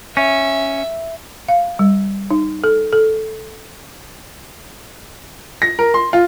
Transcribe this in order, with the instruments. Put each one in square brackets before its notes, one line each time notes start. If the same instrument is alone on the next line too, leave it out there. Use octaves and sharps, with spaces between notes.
[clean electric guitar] C#4 [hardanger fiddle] E5
[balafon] F5
G3
D#4
A4
A4
[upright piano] A#6
A#4
C6
F4